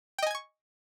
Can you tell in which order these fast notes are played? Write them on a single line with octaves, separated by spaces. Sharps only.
G5 D#5 G#5 G#6 C#6